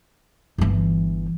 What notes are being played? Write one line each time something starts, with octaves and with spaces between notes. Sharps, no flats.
G1 E3